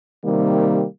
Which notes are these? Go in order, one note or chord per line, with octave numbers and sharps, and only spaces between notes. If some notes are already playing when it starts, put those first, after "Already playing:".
C3 D#3 G3 A#3